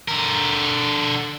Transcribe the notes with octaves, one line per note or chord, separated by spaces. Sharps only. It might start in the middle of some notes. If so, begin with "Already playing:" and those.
D3 A#4